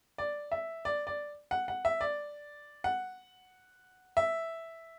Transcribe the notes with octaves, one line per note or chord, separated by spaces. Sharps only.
D5
E5
D5
D5
F#5
F#5
E5
D5
F#5
E5